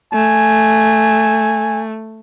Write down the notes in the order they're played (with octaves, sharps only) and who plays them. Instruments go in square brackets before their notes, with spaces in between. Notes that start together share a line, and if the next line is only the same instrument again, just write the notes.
[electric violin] A3 [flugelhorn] G#5